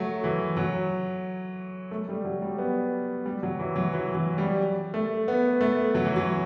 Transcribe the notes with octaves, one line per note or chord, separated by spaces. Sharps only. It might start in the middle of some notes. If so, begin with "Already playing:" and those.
Already playing: F#3 A3
E3
F#3
A3
G3
F#3
G3
B3
G3
F#3
E3
F#3
E3
F#3
G3
A3
B3
A3
F#3
E3
F#3